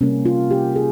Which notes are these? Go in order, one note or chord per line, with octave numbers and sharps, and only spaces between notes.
C3 G3 A#3 C#4
F4
G4
G#4